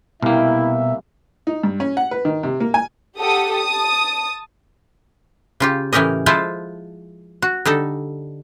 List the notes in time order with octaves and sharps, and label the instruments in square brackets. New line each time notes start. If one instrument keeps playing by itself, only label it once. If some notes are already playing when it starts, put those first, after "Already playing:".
[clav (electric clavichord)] C2 A#3 [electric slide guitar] B2 G5 [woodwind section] E4 [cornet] E5
[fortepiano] D#4
G2
C#4
F#5
B4
D#3
C3
A#3
G#5
[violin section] G4 A4 F#5 D#6
A5 D#6
[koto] C#3 F4 G4
A2 E3 C#4 G4 A#4 D#5
F3 G#3 E4 F4 C5 A5
F#4
D3 G3 D#4 A4